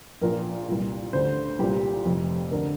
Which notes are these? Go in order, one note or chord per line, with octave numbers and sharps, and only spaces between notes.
A#1 A#2 A#4
C2 A#2
D2 D3 C5
C2 A#2 G4
F1 F2 C3
D2 D3 A#4